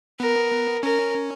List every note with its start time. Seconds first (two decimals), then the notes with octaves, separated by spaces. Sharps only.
0.20 B3 A#4
0.83 C#4 A#4